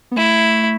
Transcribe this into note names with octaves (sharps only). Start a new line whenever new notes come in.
B3
A3 E4